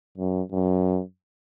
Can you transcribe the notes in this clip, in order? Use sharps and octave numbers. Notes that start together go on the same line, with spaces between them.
F#2
F#2